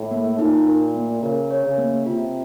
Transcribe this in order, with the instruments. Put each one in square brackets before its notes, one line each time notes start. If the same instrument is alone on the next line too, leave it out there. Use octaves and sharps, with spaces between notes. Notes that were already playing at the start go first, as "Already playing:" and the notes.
Already playing: [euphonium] A2
[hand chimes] A#3
[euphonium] A#2 [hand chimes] D#4
[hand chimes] A#4
A#3
[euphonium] C#3 [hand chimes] A#4
[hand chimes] C#5
[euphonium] C#3
[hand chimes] A#3
[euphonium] C3 [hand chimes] F4